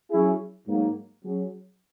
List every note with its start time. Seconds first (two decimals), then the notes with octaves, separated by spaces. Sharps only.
0.10 F#3 C#4 E4 G#4
0.67 G#2 F#3 A#3
1.24 F#3 C#4 G#4